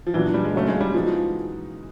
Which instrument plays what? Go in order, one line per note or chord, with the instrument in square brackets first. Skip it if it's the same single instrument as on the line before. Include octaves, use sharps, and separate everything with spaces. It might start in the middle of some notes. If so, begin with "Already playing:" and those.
[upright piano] F3
[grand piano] A#2 F#3 B3 D4 [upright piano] E3
[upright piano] G3
G#3
[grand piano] C#3 F#3 A#3 C#4 [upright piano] A3
[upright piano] G#3
G3
[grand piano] E3 G#3 B3 D#4 F#4 [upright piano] F3